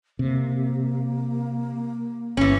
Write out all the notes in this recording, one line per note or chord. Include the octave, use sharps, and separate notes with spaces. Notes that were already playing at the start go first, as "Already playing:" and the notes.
C3 A#3
G1 E3 C#4